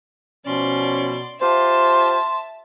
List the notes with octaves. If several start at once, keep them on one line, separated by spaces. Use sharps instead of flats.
B2 F3 C#4 D5 C6
F4 G4 C5 E5 A5 C6